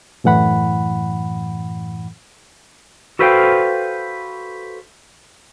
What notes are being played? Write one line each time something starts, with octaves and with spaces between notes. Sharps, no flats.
F#2 A2 E3 F#5 B5
F#4 A4 B4 C5 F5 G5